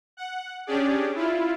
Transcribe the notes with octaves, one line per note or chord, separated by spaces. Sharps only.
F#5
C#4 D4 G4 G#4 D5
E4 F4